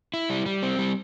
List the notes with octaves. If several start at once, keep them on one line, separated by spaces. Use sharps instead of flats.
E4
G3
G3
C4
G3